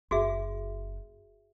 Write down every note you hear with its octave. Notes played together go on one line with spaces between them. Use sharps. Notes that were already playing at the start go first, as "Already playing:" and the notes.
F#1 F#4 G#4 E5